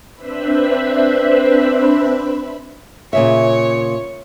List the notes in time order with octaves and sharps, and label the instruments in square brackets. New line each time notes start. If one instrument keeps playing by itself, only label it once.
[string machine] C4 D4 B4 C5 E5 B5
[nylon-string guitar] A#2 C#3 E5 [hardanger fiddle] C#5